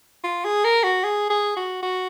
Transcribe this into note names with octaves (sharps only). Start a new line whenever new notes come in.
F4
G#4
A#4
F#4
G#4
G#4
F#4
F#4